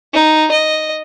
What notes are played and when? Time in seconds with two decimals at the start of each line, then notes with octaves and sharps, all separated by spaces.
0.13 D#4
0.51 D#5